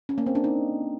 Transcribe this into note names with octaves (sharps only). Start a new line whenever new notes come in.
C#4
A#3
C4
D4
D#4